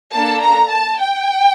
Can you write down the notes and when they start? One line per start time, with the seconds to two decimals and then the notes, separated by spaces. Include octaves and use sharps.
0.13 A#3 D4 A4 A5
0.42 A#5
0.71 A5
0.99 G5